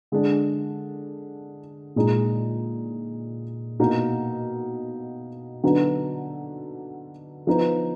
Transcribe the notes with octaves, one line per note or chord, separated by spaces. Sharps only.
D3 G#3 D4
A#2 G#3 D#4
B2 A#3 D#4
D3 F#3 B3 D#4
F3 B3 D#4